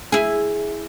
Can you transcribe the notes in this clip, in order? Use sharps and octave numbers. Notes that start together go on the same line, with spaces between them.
E4 G#4